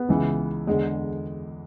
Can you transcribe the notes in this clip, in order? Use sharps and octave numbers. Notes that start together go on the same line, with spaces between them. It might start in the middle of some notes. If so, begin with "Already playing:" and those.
Already playing: B3
C#2 C#3 E3
E2 D3 G#3